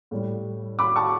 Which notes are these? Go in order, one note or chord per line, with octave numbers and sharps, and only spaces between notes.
A2 G3
B5 D6
A5 C#6